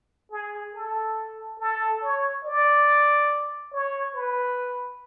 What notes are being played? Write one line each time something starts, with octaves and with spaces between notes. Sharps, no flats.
G#4
A4
A4
C#5
D5
C#5
B4